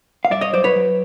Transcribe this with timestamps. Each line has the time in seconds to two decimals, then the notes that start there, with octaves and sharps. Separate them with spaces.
0.25 F5
0.30 G2 D5 E5
0.41 C#5 D#5
0.53 F#3 C5 D5
0.64 B4 C#5
0.76 F#3